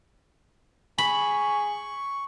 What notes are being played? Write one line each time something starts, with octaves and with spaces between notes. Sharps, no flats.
G#4 B5 C#6